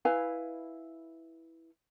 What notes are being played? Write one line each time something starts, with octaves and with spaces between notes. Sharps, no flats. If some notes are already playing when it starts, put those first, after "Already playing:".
E4 B4 F5 G#5